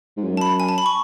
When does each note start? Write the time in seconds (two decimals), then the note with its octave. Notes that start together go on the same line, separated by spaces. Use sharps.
0.17 G#2
0.24 F#2
0.37 A5
0.41 B5
0.60 G#5
0.69 A5
0.78 B5
0.86 C#6